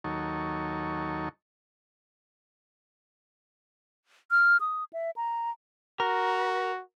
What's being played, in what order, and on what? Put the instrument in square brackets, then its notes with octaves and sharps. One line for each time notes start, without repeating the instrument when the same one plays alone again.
[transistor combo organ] D#2 F#3 D#4 A4 C#6
[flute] F6
D#6
E5
A#5
[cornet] F#4 [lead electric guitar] A#4